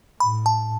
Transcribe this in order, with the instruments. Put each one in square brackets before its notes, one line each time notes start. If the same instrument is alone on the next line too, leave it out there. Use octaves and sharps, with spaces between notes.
[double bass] A2 [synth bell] B5
[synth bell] A5